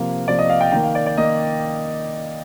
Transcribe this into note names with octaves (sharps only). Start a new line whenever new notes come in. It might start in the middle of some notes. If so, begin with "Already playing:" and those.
Already playing: C3 F3 A#3 F5
C3 F3 A#3 D5
D#5
F5
G5
D#3 A#3 G5
F5
D5
D5
D#3 A#3 D#5